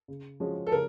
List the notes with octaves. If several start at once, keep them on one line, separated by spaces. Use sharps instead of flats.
C#3
F3 G#3 C#4 F#4
A4
C#3 A#4